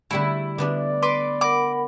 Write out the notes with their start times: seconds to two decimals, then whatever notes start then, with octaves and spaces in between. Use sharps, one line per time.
0.11 D3 G3 A3 E4
0.58 D3 B3 D4 D5
1.02 B4 C6 D6
1.41 A#4 F#5 B5 D6